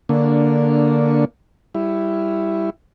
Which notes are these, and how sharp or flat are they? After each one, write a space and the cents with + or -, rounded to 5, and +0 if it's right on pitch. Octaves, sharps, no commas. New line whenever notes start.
D3 +0 A#3 +0 D4 -15
G3 +0 E4 +5